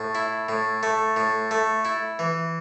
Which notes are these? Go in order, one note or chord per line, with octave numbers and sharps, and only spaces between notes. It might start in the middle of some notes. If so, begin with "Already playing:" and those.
Already playing: A2
E4
A2
A3
A2
A3
E4
E3